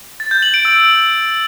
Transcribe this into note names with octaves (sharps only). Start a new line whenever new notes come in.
A6
G6
F#7
D7
E6